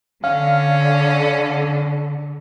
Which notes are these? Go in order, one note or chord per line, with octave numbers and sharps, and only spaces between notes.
D3 C#4 F5